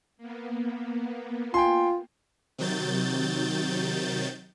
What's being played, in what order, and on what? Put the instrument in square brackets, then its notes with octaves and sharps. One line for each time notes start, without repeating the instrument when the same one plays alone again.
[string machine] A#3 B3
[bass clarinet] F4 [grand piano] G5 G#5 C6
[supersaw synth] C3 D#3 F#3 G6 A6